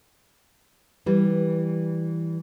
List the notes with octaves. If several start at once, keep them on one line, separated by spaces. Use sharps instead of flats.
E3 G3